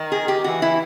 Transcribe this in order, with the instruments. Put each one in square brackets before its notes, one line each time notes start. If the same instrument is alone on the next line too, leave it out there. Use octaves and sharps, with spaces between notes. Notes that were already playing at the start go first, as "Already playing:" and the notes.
Already playing: [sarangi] D#3
[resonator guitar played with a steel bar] G#4
G4
[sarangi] E3 [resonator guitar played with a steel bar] F#4
[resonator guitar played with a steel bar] E4